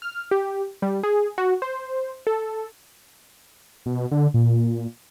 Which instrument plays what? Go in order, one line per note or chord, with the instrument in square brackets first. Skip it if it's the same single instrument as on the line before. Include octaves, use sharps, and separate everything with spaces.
[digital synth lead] F6
G4
G3
G#4
F#4
C5
A4
[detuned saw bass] B2
D3
A#2